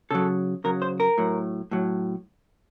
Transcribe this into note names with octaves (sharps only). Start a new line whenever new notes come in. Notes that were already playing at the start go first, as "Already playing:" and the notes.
C#3 F#3 A4
C#3 F#3 A#4
C5
A#4
A2 F#3
A2 F#3